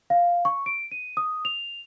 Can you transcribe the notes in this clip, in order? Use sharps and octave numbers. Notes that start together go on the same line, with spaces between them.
F5
C#6
D7
D#7
D#6
F7